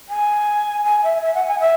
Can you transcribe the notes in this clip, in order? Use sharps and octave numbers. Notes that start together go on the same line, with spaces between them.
G#5
G#5
E5
E5
F#5
G#5
E5